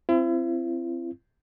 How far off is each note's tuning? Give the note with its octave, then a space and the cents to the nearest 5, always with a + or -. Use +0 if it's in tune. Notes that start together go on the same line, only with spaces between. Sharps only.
C4 +0 E4 +40